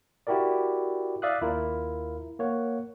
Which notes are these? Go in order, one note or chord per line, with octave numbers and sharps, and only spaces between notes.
E4 F#4 G4 A#4 D5
D5 E5 F5 D#6 F#6
D#2 E4 F4 A#4
A#3 C#5 F#5